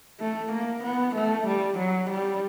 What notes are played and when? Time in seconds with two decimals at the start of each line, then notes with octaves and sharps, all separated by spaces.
0.20 A3
0.52 A#3
0.84 B3
1.16 A3
1.47 G3
1.79 F#3
2.11 G3